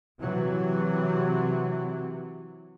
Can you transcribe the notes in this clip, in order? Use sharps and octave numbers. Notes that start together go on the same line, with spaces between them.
C3 E3 F#3